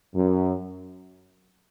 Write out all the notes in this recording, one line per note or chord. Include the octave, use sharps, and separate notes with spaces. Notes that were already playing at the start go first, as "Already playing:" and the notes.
F#2